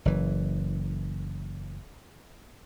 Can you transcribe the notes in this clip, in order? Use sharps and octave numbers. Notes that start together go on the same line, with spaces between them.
F#1 E3